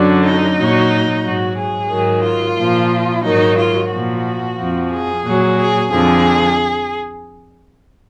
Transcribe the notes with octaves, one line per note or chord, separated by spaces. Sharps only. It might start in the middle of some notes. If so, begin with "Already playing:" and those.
Already playing: F#2 D3 F#3 D4
D#4
A#2 F#3
G#2 F#3 F#4
G#4
G#2 D#3 F#3
F4
A#2 F3
G#2 D#3 F#3 D#4
F4
A#2 F3 F#4
F2 F3
G#4
A#2 F#3
G#4
F2 D3 F3 G#4